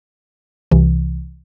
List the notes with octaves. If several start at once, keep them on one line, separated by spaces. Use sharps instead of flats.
C2 C3 E3